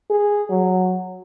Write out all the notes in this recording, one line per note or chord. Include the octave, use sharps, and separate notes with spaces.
G#4
F#3